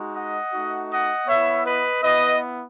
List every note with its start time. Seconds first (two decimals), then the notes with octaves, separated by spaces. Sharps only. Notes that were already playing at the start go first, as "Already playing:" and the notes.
Already playing: G#3 D#4 F#4
0.15 D#5 F#5
0.52 A3 D#4 F#4
0.91 D#5 F#5
1.28 B3 E4 C#5 E5
1.65 B4 D#5
2.03 B3 E4 B4 D#5